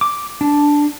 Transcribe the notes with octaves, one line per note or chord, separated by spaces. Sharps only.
D6
D4